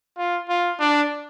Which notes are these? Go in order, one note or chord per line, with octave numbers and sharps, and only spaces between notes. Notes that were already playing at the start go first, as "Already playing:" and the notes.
F4
F4
D4